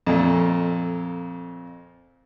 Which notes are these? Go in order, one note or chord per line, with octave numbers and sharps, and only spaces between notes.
F2 A#2 A3